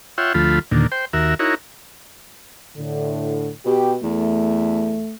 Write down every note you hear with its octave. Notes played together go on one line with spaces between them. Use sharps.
F4 C#5 E5 F#5 G5 C6
D2 F3 A3 F4 B5
D#2 A#2 D3
C5 G5
D#2 F#4 A#4 E5
D#4 E4 F#4 A#4 C#5
A2 D3
B2 G4
E2 A3